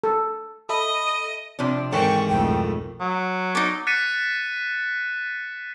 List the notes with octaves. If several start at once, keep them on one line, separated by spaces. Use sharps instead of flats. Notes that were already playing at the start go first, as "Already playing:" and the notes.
A4
A4 D#5 E5 B5 D#6
C3 F3 D4
G#2 D#3 E3 C4 A4 G5 C#6
B1 F2 A3 G5
F#3
D#4 D5
F#6 A6 B6 C#7 D#7 E7